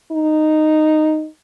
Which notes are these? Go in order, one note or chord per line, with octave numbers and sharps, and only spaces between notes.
D#4